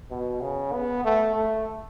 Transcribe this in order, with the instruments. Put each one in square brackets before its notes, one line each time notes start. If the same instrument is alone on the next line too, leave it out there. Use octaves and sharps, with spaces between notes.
[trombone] B2
C#3
B3
A3
A3